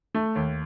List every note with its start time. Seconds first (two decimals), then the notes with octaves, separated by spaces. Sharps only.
0.14 A3
0.35 D#2